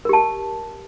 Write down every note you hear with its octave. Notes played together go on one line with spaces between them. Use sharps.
G4 A#4 A5